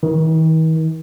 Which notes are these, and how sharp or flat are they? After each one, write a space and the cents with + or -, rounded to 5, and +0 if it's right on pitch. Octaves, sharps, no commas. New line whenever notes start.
D#3 +45